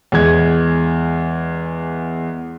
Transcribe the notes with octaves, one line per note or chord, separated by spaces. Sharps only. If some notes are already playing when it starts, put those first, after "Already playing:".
E2 G#3 G#6